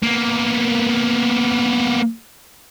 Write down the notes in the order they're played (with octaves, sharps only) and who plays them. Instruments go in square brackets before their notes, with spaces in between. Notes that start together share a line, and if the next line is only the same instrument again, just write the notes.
[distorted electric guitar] A#3 B3